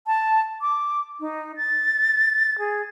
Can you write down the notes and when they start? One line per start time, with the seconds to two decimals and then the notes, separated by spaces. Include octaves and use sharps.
0.07 A5
0.61 D6
1.20 D#4
1.57 A6
2.59 G#4